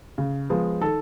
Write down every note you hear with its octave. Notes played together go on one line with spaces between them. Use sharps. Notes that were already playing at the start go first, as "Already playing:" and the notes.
C#3
F3 G#3 B3
D#3 A4